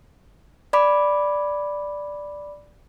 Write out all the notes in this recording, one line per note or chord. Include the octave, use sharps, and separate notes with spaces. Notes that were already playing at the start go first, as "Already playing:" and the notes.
D5 B5 D6